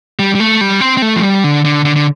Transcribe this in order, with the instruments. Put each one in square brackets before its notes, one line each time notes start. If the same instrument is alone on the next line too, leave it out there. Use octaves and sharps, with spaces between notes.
[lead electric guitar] G3
G3
A3
G3
C4
C4
A3
F3
G3
D3
D3
D3
D3